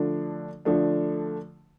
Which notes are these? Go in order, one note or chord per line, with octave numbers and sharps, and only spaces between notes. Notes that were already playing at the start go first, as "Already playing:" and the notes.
Already playing: D3 F3 A3 D4
D3 F3 A3 D4